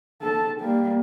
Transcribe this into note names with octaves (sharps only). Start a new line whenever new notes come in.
A4 A5
G3 A#3